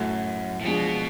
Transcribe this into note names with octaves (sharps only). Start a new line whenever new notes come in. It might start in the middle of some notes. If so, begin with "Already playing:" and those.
Already playing: F#2 A2 F#3 A3
A2
B2 F3 G#3 D4 G#4